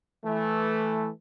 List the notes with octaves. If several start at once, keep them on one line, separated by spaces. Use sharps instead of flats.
E3 A3